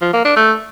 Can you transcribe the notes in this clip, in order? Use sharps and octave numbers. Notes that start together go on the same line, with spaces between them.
F3
A#3
D4
A3